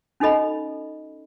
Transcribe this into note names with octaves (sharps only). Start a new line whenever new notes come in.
C#4 D#4 F#4 A4 D#5 B5